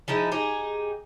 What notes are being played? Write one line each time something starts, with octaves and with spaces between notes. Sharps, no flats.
F3 G#3 D#4 E4
D#4 G4 G#4